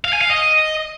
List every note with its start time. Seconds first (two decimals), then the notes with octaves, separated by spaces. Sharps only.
0.05 F5
0.13 G#5
0.21 F5
0.30 D#5